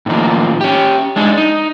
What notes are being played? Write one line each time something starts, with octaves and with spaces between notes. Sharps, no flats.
A2 D3 D#3 F3 A#3
C#4 G4
G#3 D4 D#4
D#4